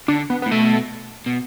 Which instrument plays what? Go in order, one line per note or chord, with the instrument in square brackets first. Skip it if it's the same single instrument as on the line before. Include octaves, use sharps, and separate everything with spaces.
[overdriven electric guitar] D3 [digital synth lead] D4
[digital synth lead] B3
[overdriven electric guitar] A2 [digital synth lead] B3
[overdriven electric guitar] B2 [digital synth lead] A3
[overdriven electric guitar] B2